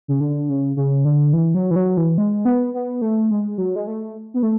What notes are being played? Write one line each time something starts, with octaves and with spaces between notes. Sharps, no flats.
C#3
D3
C#3
C#3
D3
E3
F#3
E3
F#3
E3
G#3
B3
B3
A3
G#3
F#3
G#3
A3
B3
A3